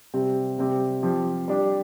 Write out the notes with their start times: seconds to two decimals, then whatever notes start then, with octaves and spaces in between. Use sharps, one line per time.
0.14 C3 G3 C4
0.58 C3 G3 C4 G4
1.03 F3 C4 G4
1.48 G3 D4 G4